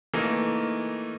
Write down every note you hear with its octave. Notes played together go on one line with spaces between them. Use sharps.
E3 A3 A#3 D#4